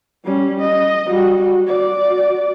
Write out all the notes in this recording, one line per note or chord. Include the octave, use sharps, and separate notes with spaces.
G3 C#4
D#5
G3 F#4
F#4 D5